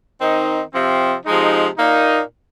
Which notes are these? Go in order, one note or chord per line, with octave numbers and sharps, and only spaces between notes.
D#3 C4 D#4
C3 F3 C4
C3 F3 G#3 D#4
A#2 A#3 D#4